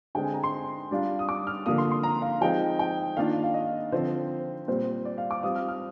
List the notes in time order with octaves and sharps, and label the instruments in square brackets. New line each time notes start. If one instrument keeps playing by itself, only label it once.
[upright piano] D3 G#3 C4 G5
G#5
A#5
C6
G3 D4 F4
D#6
D6
F6
D3 F3 A#3 D#6
C6
C6
A#5
F5
F3 G#3 C4 D#4 G5
G5
D#3 A#3 D4 F4 F5
F5
D#5
D3 F3 C4 C5
A#2 G3 C4 C5
D5
F5
D6
G3 C4 F4 D#6
F6
F6